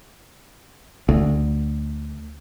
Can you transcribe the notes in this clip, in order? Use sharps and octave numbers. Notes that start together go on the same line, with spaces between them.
D2